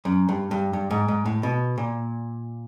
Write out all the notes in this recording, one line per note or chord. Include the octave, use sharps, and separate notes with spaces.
F#2
G2
G2
G2
G#2
G#2
A2
B2
A#2